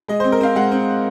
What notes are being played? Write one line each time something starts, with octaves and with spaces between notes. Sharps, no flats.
G#3 D#5
C5
C4
A#4
C4 F5
G#3 F#5
C4